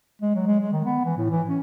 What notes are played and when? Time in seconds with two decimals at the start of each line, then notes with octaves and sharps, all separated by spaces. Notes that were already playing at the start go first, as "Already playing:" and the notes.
0.22 G#3
0.35 F#3
0.48 G#3
0.61 G#3
0.73 D#3
0.85 B3
1.05 E3
1.18 A2
1.30 E3
1.49 C#4